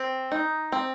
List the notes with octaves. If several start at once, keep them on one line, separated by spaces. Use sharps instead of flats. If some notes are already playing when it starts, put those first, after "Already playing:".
Already playing: C4
D#4
C4